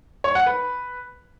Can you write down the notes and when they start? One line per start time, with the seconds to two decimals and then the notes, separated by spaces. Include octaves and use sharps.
0.24 C#5
0.35 F#5
0.46 B4